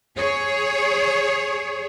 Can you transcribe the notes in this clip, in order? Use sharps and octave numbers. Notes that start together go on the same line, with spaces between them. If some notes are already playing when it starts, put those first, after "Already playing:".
G#4 C#5